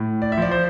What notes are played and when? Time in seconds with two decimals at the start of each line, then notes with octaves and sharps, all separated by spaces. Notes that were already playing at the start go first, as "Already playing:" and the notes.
Already playing: A2
0.22 D5
0.32 E5
0.37 F3 D5
0.51 C5